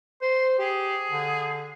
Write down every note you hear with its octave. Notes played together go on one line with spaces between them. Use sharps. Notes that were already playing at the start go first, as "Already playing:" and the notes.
C5 C6
G4 G#4
D3